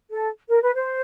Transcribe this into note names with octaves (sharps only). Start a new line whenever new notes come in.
A4
A#4
B4
C5